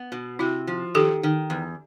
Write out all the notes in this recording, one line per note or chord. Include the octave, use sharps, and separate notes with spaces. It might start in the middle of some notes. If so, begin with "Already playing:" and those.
Already playing: B3
B2
C3 E4 F#4
F3
D#3 G4 A4
D#3
E2